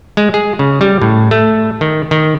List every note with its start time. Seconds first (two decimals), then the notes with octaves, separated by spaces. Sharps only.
0.17 G#3
0.34 G#4
0.59 C#3
0.81 G3
1.02 A2
1.31 A3
1.81 D#3
2.11 D#3